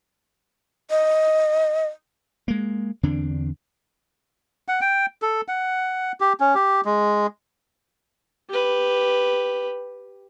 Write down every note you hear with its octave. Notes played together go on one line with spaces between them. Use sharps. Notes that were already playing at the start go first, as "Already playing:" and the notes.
D#5
G#3 A#3
E2 D3 C4 D4
F#5
G5
A4
F#5
G4
C#4
G4
G#3
G4 B4